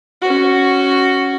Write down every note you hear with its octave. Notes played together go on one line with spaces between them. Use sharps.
C#4 F#4